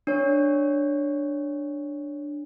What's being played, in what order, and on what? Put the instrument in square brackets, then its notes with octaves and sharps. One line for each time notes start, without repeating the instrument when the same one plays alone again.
[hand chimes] D4 C#5